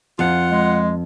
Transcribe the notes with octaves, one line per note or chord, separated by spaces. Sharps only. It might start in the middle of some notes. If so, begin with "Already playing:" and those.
F2 F4 F#5
G#3